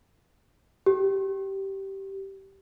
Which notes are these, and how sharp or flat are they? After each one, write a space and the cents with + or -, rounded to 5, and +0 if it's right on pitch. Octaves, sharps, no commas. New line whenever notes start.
G4 -15